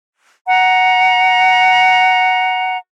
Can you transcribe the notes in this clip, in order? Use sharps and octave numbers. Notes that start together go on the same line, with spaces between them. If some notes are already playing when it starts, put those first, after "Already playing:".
F#5 A#5